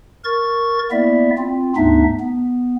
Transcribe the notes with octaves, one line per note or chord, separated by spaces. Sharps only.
A#4 C#6 A6
A#3 B3 E4 D5 E5
C4 F4
D2 G#2 B3 D4 D#4 E5
B3